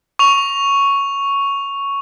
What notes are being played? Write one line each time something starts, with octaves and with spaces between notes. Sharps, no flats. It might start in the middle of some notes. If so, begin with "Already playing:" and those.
C#6 F7